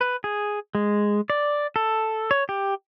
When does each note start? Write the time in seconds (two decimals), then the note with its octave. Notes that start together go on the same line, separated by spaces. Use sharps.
0.01 B4
0.24 G#4
0.75 G#3
1.30 D5
1.76 A4
2.31 C#5
2.49 G4